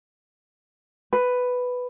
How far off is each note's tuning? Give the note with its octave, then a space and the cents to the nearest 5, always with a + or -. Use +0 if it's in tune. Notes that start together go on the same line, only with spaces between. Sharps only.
B4 +5